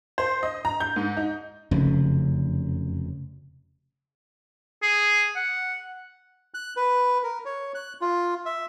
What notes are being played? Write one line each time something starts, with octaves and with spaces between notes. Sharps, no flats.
C5
D#5
A#5
G6
G#2
D#4
F1 F#2 C#3
G#4
F#5
F#6
B4
A#4
C#5
F#6
F4
E5